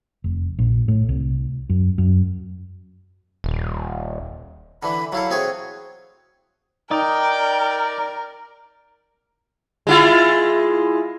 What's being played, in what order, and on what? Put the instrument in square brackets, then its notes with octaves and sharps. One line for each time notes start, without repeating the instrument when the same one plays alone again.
[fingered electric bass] F1
A#1
A2
C2
F#2
F#2
[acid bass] D#1
[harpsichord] D3 E3 [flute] B5
[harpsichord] F#3 E4 A4 [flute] F5
[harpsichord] C4 G#4 C#5 [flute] F#4
[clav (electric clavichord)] D#4 [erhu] A#4 [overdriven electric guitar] D5 [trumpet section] G5
[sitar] G#3 E4 F4